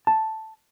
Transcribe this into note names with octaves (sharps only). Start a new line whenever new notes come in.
A5